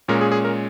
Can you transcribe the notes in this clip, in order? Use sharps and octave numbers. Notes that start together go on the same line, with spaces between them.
A#2 G#3 C#4 A#4
G#4
G#4
A#4